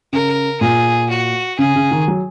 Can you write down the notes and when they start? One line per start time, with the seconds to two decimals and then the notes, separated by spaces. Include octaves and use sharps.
0.13 C#3 A#4
0.61 A#2 G#4
1.10 F#4
1.59 C#3 G#4
1.76 C#3
1.91 D#3
2.08 F#3